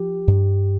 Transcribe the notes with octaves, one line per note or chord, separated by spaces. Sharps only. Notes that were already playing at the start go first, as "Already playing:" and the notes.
Already playing: F3 G4
G2